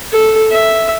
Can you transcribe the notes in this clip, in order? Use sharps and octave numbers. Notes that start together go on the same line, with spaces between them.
A4
E5